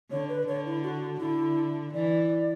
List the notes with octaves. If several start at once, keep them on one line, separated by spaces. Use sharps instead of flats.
D3 C#5
B4
D3 C#5
E4
F#4
D3 E4
E3 D5